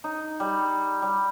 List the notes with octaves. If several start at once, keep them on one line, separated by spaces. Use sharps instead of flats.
D#4
G3
G3